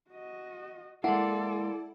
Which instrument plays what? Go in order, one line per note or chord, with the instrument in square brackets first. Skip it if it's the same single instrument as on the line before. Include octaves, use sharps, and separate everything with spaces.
[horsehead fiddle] F#4 D#5
[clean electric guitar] G#3 A#3 [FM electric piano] E4 [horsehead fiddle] A4 D5 [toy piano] F#5